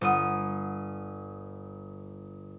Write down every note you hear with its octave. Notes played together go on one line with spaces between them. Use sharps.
G1 D#6